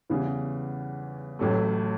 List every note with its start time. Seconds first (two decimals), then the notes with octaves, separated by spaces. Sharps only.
0.10 E2 C#3 E3 G3
1.39 A1 A2 F#3 A3